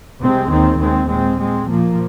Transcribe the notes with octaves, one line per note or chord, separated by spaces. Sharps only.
C2 C3 G#3 C4
D#2 D#3 C4
D#2 D#3 G#3 C4
A#2 G#3 C4
A#2 G#3 C4
A#2 F3 A#3